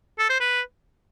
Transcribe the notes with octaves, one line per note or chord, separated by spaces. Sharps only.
A4
C5
B4